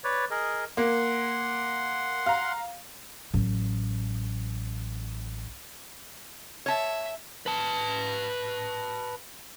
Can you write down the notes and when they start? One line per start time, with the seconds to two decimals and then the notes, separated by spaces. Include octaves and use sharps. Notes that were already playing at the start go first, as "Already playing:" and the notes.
0.04 B4 C#5 D5
0.31 G#4 A#4 D#5
0.77 A#3 F#5 C6
2.26 F5 A#5
3.34 A1 F#3
6.66 C#5 E5 A5
7.46 B4 A5